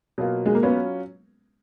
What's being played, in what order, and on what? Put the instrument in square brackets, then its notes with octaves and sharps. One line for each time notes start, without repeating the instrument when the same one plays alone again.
[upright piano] B2 F#3 A#3 F4
[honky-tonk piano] G#3
A#3
[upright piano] F#3 C#4 F4 [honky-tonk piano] B3